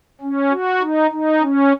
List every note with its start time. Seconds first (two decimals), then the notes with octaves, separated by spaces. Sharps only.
0.21 C#4
0.51 F#4
0.81 D#4
1.11 D#4
1.41 C#4